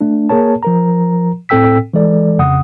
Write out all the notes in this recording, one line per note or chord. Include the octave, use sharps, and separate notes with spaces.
A3 D4
A#3 G#4 A#4 C#5 A5
F3 A#4 A#5
A2 C4 A4 G5 E6 B6
E3 G#3 A4 D5
F2 C#3 F#5 D#6